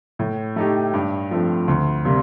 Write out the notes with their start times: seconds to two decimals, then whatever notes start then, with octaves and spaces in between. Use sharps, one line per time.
0.19 A2
0.56 A3 D#4 G4
0.93 G2
1.31 F3 A3 C4
1.68 D2
2.05 C3 G3 A#3